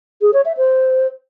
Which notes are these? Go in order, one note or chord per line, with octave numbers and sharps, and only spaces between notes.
G#4
C#5
E5
C5